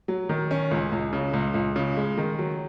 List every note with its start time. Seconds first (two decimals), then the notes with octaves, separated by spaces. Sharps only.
0.08 F#3
0.29 D#3
0.51 C#4
0.71 C#2
0.92 C#2
1.13 C#3
1.33 C#2
1.54 C#2
1.76 C#3
1.97 G#3
2.17 D#3
2.39 F#3